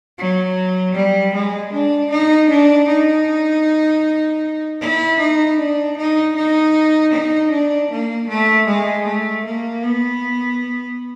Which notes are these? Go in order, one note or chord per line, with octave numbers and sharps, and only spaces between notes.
F#3
G3
G#3
D4
D#4
D4
D#4
E4
D#4
D4
D#4
D#4
D#4
D4
A#3
A3
G#3
A3
A#3
B3